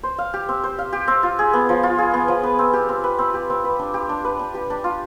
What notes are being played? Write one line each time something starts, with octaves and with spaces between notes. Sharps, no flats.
C5
F5
G4
C4
C5
F5
G4
C4
F4
G#4
B3
F3
F4
G#4
B3
F3
B4
C4
G4
C4
B4
C4
G4
C4
B4
D4
G4
D4
B4
D4
G4
D4
F4